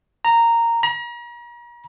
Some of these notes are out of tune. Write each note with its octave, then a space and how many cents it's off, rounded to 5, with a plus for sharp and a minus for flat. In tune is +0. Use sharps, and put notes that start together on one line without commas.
A#5 -10
A#5 +40